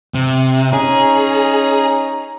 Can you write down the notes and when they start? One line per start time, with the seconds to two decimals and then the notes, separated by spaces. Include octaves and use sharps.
0.15 C3
0.73 C#4 D#4 G#4 A#5